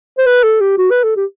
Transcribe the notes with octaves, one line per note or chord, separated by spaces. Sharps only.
C5
B4
A4
G4
F#4
B4
A4
G4